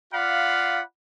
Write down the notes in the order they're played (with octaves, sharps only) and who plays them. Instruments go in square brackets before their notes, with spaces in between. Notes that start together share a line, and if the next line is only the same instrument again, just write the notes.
[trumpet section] F4 D5 F5 F#5 B5